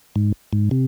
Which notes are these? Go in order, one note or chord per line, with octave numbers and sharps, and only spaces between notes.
G#2
G#2
C3